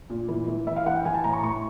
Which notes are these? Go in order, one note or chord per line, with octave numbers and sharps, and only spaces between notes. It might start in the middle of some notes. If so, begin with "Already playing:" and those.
A#2
E3
E3
E3 E5
F5
E3 F#5
G5
E3 G#5
A5
A2 A#5
C#6
A2 C#6